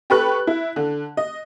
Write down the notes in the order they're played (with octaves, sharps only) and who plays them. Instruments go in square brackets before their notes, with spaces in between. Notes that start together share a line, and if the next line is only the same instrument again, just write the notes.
[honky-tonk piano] G4 A4 B4 C#6 F#6
E4
D3
D#5